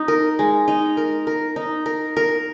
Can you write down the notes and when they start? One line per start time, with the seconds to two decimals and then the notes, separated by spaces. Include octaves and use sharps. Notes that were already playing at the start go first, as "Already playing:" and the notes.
Already playing: D#4
0.08 A#4
0.39 G#3
0.68 D#4
0.97 A#4
1.27 A#4
1.56 D#4
1.86 A#4
2.17 A#4